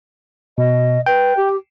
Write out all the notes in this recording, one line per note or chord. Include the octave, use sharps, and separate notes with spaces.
B2 D#5
B4 G5
G4